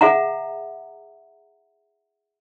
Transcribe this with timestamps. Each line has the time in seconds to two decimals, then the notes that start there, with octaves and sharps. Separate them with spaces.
0.01 G#4 E5 F#5 A#5